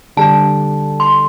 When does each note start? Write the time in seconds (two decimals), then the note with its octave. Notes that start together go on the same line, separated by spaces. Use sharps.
0.17 D3 G3 D4 A5
1.00 C6